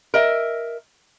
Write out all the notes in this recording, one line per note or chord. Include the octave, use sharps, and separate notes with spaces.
A#4 D#5 E5